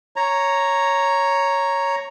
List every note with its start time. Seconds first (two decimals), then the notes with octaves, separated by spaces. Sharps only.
0.16 C#5 A#5